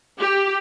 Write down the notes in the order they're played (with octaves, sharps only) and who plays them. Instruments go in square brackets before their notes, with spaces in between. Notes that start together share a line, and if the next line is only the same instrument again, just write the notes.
[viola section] G4